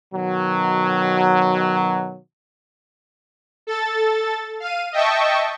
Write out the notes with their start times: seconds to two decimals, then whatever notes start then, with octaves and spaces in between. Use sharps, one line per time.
0.13 B2 D#3 F#3
3.67 A4 A6
4.60 F5 D#7
4.92 D#5 E5 G5 A5 C#6